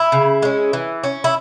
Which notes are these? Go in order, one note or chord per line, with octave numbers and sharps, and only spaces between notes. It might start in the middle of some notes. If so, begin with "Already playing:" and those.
Already playing: E4
C#3
G#3 C#4
E3
C#4
E4